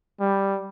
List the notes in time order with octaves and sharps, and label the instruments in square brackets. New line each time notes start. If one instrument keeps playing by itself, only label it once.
[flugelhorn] G3